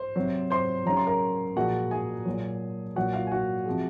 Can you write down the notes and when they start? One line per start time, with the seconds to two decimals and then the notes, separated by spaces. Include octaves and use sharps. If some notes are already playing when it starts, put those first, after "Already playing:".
Already playing: C5
0.16 C3 F#3
0.50 C5 C6
0.85 C#3 F#3 A#5
0.97 C6
1.07 A#4 A#5
1.56 A#2 F3 G#3 F#4 F#5
1.91 G#4 G#5
2.26 A#2 F#3
2.96 A#2 F#3 F#4 F#5
3.13 F4 F5
3.27 G#5
3.32 F#4 F#5
3.66 C3 F3 G#3